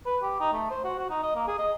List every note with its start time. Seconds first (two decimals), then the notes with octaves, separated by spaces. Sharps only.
0.06 B4
0.23 G4
0.41 D#4
0.53 A3
0.70 C5
0.84 F#4
0.99 F#4
1.10 D#4
1.23 D#5
1.36 A#3
1.47 G#4
1.59 D#5